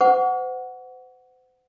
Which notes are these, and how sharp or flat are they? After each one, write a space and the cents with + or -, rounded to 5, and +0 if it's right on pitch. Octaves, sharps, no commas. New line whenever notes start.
C5 -40 F#5 +0 C#6 +40